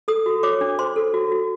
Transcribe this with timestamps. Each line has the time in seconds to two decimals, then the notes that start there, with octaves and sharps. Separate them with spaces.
0.08 A4 D#6
0.26 F#4
0.43 C#5 D6
0.61 D4
0.79 C5 C6
0.96 A4
1.14 F#4
1.32 F#4